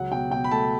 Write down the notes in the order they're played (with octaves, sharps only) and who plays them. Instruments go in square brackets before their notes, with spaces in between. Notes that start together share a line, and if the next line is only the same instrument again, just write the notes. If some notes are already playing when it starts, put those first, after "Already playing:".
Already playing: [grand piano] C#2 F#3 F#5
B2 G5
B2 G5
B5
A3 A5